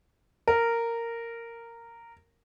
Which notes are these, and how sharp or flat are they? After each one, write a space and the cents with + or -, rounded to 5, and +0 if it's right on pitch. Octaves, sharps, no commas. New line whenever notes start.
A#4 -10